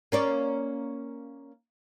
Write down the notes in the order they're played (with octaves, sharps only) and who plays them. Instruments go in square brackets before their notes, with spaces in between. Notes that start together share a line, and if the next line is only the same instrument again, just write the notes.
[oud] A#3 C#4 D5